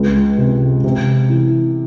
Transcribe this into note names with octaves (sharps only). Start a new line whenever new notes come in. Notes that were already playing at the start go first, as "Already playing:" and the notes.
Already playing: C#2
C3
C3
E3